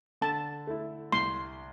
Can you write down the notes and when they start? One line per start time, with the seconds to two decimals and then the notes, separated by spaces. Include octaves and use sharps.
0.21 D3 A5
0.67 A3 E4
1.12 C2 C6